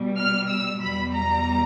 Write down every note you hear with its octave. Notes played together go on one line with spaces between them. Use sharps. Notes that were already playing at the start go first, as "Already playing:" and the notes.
Already playing: B2 G3
F6
E6
E2 B2 G3 B5
A#5